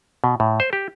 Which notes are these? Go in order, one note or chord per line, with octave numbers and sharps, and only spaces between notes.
B2
A2
C5
G4